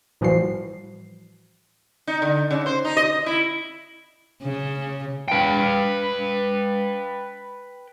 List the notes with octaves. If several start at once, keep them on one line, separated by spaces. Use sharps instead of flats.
A2 E3 F3 G3 F#4 C7
D#4
D3
C#3
C5
D#4
D#5
E4
C#3
B4 G5